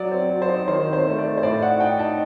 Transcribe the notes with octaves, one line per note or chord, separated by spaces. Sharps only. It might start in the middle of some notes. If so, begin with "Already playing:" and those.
Already playing: F#3 D5
C4
F#3
C5
D#4
D#3 C5
C4
C5
A3
D5
A3
C5
A2 D5
D#4 F#5
D#4 G5
D#4 A5